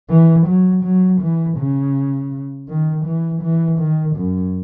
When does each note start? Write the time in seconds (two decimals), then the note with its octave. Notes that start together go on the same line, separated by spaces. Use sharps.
0.10 E3
0.46 F#3
0.84 F#3
1.20 E3
1.57 C#3
2.68 D#3
3.05 E3
3.42 E3
3.79 D#3
4.16 F#2